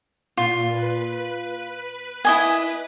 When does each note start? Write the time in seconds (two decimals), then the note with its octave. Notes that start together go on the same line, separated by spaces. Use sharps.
0.37 A#2 F4
0.72 B4
2.25 E4 D#5 G#5